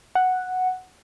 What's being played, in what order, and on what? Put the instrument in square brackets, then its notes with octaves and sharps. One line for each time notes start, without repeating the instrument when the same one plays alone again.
[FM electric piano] F#5